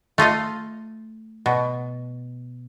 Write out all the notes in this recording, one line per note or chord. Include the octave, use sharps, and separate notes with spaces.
A3 F4 D#5 F5
B2